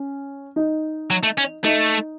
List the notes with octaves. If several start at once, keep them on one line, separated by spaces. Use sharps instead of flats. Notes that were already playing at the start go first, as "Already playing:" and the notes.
Already playing: C#4
D#4
F#3
A3
C#4
A3 D#4